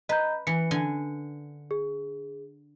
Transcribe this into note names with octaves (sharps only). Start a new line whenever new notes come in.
B4 D#5 A#5 G6
E3 C#7
D3 G#5
G#4